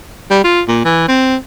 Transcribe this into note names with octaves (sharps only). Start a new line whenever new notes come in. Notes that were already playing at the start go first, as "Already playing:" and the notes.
G3
F4
A#2
E3
C4